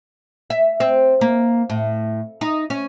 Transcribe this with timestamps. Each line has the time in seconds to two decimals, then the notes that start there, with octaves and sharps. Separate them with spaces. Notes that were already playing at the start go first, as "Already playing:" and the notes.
0.50 E5
0.80 C4
1.21 A#3
1.70 A2
2.41 D#4
2.70 C#4